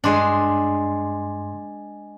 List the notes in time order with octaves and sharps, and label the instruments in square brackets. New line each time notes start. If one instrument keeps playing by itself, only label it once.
[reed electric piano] G2 C6 [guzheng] G#3 D4